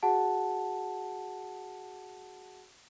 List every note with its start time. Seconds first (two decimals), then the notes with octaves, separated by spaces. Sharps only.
0.03 F#4 G#4 F#5 A5